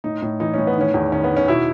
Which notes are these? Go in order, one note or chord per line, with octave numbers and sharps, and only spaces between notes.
A2 D#4
A2
E3 D#4
A2 C#4
B3
D#3 C#4
E2
D#3 C#4
B3
D#3
C#4
B2 E4